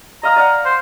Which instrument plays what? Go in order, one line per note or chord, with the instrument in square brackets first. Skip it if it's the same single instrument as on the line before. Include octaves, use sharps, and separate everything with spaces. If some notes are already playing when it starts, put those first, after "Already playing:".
[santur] D#5 F5 D#6 [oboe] A#5
[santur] D5 F5 F#5
[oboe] C5